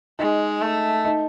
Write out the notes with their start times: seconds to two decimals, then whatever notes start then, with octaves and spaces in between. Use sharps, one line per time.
0.19 G#3 D#4
0.62 A3
1.05 D#4